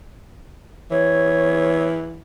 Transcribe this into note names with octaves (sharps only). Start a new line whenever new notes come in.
E3 C#5